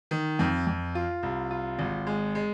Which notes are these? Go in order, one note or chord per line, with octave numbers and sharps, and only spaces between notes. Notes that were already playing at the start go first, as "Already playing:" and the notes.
D#3
F2
F2
F4
C2
F4
G#1
G#3
G#3